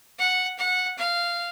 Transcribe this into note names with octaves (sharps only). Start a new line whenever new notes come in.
F#5
F#5
F5